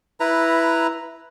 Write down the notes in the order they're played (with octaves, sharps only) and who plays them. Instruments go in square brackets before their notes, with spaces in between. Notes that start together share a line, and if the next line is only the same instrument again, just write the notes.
[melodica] E4 B4 A#5